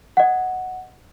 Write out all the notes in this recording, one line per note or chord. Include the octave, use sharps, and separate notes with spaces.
D#5 F#5